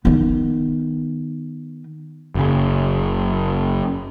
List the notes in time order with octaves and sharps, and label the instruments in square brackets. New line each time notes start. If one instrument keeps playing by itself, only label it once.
[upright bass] D#3 B3
[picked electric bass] F#1 C#3